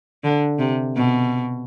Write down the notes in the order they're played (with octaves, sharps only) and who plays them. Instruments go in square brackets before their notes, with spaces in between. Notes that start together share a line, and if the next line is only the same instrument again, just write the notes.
[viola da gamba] D3
C3
B2